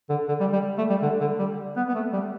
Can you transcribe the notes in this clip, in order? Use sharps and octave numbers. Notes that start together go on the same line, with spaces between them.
D3
D3
G3
G3
A3
G3
D3
D3
G3
B3
B3
A3
G3